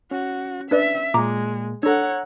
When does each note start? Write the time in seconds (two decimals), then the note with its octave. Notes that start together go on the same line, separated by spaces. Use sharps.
0.11 C#4 F#4
0.71 D4 B4 D5 E5
1.14 A#2 G#3 A#3 A#5 D6
1.83 D4 A4 C#5 F#5 A#5 E6